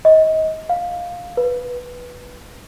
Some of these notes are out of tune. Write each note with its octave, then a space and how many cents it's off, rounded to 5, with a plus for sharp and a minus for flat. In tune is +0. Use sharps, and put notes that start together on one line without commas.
D#5 +25
F5 +10
B4 -5